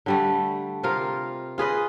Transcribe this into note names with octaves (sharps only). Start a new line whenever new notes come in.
D3 G3 A3
C3 F4 A#4
F4 G#4 B4 D#5